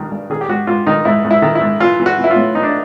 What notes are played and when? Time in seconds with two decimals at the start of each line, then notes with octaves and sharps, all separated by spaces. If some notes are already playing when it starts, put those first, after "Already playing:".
Already playing: G2 D#3
0.11 G2
0.30 D#3 G#4
0.41 G4
0.48 G#2 F#4
0.67 G#2 F4
0.86 D#3 D#4
1.05 G#2 E4
1.24 G#2
1.31 E4
1.42 D#3
1.55 E4
1.61 G#2
1.80 E3 F4
2.00 E3
2.06 F#4
2.18 E3
2.24 E4
2.31 F4
2.36 A2
2.55 E3 D#4
2.63 D4